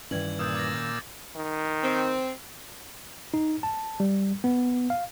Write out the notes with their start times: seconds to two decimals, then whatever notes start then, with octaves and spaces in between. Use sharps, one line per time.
0.11 G2 D#3 E3 C#4 G#6 F#7
0.39 A#2 D#6 E6 G6 A6
0.55 D6 A6 A#6
1.36 D#3
1.83 C4
3.34 D#4
3.63 A5
4.00 G3
4.44 B3
4.90 F5